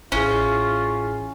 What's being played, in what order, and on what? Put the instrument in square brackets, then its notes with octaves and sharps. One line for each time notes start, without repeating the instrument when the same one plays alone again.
[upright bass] A1 [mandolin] C#4 [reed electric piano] E4 G#4 [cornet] F4